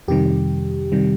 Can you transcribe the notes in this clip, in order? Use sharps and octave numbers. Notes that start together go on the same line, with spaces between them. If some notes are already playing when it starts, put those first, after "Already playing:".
F2 C3 D#3 G3 G4
C3 D#3 G3